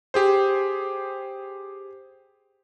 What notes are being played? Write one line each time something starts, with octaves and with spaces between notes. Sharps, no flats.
G4 G#4 C5